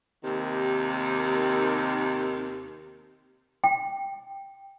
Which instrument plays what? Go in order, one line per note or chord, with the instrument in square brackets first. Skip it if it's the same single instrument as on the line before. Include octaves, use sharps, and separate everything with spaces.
[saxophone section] D#2 C3 D#3
[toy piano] G5